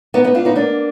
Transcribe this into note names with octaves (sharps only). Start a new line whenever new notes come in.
B3 D#4
B3 D#4
D4 F4
B3 D#4
A#3 D4